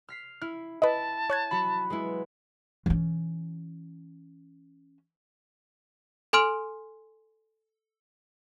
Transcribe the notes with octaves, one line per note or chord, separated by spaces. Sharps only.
F6 B6 C7
E4 F6
E4 B4 D#5 A5
C#5 F#6 G#6
F#3 F#4 B5
G#3 B3 E4
E3 C#4
A4 G#5 C6 F6 D7